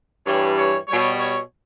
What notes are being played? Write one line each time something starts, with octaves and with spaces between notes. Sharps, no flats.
G2 E3 G3 C#5
C#5
B2 G3 C#5
C#5